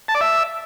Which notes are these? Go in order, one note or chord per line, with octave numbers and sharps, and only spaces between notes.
A5
D5
E5